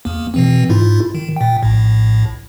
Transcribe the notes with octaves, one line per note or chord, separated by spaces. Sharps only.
E2 A#3
B2 E3 C4
G#2 E4 F4
D#3
A#2 G5
A#1 A2